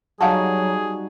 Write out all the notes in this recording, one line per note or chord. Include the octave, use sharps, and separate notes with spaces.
F#3 G3 D#4 F#4 G#4 F5 F#5 A5